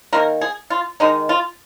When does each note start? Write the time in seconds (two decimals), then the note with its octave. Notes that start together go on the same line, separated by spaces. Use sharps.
0.12 D#3 A#3 A#4
0.41 G#4
0.70 F4
1.00 D#3 G#3 D#4
1.29 F4